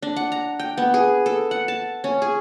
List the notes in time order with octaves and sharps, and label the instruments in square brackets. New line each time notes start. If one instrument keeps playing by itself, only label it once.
[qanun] D4
F#5
A#5
G5
B3
G#4
A4
F#5
A5
C#4
G#4